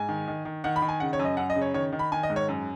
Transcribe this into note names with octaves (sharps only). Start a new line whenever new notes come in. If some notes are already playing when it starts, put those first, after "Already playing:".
Already playing: G#2 G#5
D#3
D#3
D#3
D#3 F#5
B5
D#3
G#5
C#3 F#5
C#5
F#2
D#5
F#2 F#5
D#5
C#3
C#5
D#3 C#5
D#3
B5
D#3 G#5
D#5
G#2
C#5
F#2